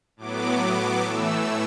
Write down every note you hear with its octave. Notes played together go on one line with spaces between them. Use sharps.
A2 F#3 B3 D6
A2 E3 A3 E6